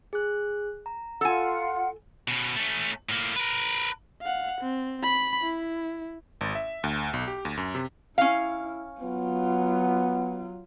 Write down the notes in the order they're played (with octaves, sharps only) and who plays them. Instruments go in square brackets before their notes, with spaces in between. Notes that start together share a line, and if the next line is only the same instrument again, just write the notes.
[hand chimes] G#4 F#6
A#5
[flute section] F4 F#5 [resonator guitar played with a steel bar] A4 G#5
[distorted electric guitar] B2 C#4
A3 C#4
A2 A#3
A#4 B4
[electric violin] F5 F#5
C4
B5
E4
[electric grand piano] G#1
E5
D2
B1
G4
D2
F#2
C3
[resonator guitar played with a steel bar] C#4 F5 [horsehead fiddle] E4
[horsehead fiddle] F#3 F4 [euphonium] B3